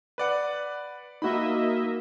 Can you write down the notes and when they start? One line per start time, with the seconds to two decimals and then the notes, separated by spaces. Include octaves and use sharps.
0.18 B4 D5 F#5
1.22 A#3 D#4 F#4 D#5 E5 B5